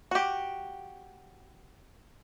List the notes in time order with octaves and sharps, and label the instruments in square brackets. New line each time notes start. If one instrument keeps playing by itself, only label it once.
[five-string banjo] F#4 G4